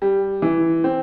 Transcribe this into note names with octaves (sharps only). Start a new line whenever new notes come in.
G3
E3
C4